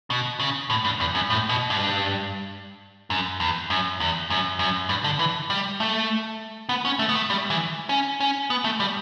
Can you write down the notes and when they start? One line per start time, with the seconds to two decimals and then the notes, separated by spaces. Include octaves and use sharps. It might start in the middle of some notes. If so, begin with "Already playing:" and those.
0.10 B2
0.40 C#3
0.70 A2
0.84 G2
1.00 E2
1.15 F#2
1.30 A2
1.49 B2
1.70 G2
3.10 F#2
3.40 E2
3.70 F#2
4.00 E2
4.30 F#2
4.59 F#2
4.89 G2
5.04 D3
5.19 E3
5.50 G3
5.80 A3
6.69 B3
6.85 C#4
6.99 A3
7.09 B3
7.15 A3
7.30 G3
7.50 E3
7.89 C#4
8.20 C#4
8.50 B3
8.64 A3
8.80 G3